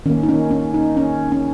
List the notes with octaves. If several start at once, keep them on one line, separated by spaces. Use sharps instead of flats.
D#3 A#3 C#4
D#4
C#4
C#4
D#4
C#4
C#4